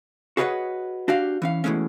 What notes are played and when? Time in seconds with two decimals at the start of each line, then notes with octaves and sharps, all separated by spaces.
0.37 F#4 G#4 B4 C#5 D#5 F#5
1.08 D4 F#4 G4 F5
1.42 E3 C#4 F5
1.64 B2 E3 G#3 A3 C#4